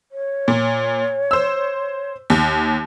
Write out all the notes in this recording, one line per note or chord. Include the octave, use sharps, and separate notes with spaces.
C#5
A#2
C5 E6
D#2